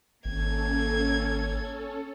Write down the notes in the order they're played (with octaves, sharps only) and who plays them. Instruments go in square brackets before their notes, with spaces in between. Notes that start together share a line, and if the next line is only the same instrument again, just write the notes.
[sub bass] G#1 [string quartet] A#3 G#6 [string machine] C#4 A4